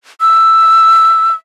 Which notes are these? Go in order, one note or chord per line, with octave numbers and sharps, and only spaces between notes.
E6